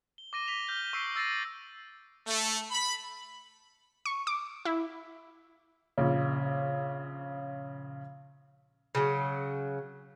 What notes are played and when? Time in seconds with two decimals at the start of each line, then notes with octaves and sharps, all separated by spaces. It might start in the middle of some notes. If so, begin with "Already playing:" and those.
0.18 G7
0.33 D6 A#6 D#7 G7
0.47 D6 B6 F7 G7
0.68 F6 G6 G7
0.93 C#6 E6 B6 C7 D7
1.16 E6 A6 A#6 C7 D#7
2.27 A3
2.71 B5
4.06 C#6
4.27 D6
4.65 E4
5.98 A#1 C#3
8.95 C#3 F#3